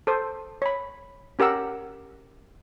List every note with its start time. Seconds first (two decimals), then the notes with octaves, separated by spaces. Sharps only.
0.07 A4 C5
0.62 C#5 B5
1.39 C#4 G4 A#4 F#5 E6